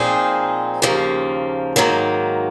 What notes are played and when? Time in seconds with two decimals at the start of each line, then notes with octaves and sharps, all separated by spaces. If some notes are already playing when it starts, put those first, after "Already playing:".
Already playing: A#2 F3 C4 D#4 G#4
0.82 D#2 C#3 F3 A#3
1.76 G#2 D#3 F#3 A#3